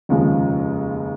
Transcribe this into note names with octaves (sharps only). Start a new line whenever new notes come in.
F1 D#2 C#3 F3 G#3